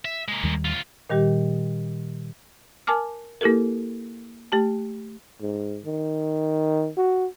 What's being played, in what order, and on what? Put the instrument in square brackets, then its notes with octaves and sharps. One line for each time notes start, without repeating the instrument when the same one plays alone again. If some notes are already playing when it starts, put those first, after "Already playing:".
[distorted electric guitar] E5
G#3 A#3
[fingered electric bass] D#2 D#3 G3
[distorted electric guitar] D2 F4
[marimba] A#2 D#3 G3 G4
A#4 G#5 A5 D6 F6
A#3 E4 G4 A4 A#4
A3 G4 A5
[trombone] G#2
D#3
F#4